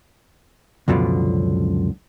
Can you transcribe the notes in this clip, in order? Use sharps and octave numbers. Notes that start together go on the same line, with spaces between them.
C#2 F#2 B2 D3 F3